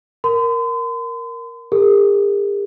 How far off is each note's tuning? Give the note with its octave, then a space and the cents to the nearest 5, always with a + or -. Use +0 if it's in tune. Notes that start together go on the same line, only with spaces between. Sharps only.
A#4 +0 C6 -45
G4 +45 A#4 -45